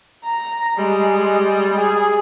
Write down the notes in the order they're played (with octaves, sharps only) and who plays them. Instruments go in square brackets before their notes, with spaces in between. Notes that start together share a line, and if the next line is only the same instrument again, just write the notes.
[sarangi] A#5
[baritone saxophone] G3 [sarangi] G#3
[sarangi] G#4